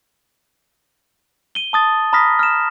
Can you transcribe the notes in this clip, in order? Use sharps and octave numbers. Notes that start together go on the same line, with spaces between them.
D#7 G7
A5 D#6 A6
A#5 B5 D#6 F6 A#6 B6
F6 E7